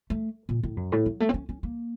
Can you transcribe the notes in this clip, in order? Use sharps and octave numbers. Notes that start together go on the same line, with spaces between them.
A3
A#2
A2
F#2
A2
F#3
A3
C4
C#4
C#4
A#3